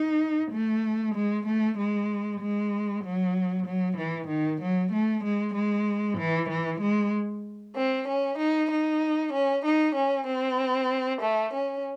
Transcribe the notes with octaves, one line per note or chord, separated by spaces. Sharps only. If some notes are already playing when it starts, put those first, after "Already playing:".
Already playing: D#4
A3
G#3
A3
G#3
G#3
F#3
F#3
E3
D#3
F#3
A3
G#3
G#3
E3
E3
G#3
C4
C#4
D#4
D#4
C#4
D#4
C#4
C4
A3
C#4